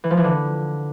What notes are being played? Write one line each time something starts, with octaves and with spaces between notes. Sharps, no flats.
E3
F3
E3
D3